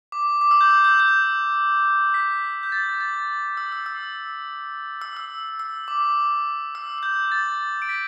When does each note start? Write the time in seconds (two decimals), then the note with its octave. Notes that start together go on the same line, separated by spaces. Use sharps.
0.12 D6
0.41 D6
0.51 E6
0.61 G6
0.71 E6
0.84 G6
1.00 G6
2.14 B6
2.63 G6
2.72 A6
3.01 A6
3.57 E6
3.72 E6
3.86 E6
5.02 E6
5.17 E6
5.59 E6
5.88 D6
6.75 E6
6.98 E6
7.03 G6
7.32 A6
7.82 D7
7.89 B6